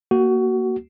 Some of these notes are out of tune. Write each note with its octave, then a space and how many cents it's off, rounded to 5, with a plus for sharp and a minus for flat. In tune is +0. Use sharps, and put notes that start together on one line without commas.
A#3 +0 F#4 +20